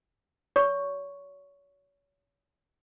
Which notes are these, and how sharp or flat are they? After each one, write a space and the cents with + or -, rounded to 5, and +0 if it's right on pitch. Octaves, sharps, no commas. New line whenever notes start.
F#4 +0 C#5 +35 C#6 +0